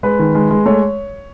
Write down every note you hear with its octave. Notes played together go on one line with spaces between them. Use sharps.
G#3 B4
D#3
G#3
G#3
A3 C#5